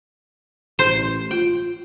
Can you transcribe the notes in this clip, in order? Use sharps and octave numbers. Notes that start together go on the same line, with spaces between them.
A1 C5
F4 G5